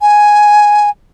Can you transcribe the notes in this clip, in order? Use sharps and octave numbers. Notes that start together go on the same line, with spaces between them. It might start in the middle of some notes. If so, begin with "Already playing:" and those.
G#5